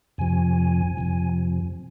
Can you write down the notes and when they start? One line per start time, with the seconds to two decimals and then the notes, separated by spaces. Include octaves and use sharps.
0.18 F2 C3 F3 G#5
0.97 F2 C3 F3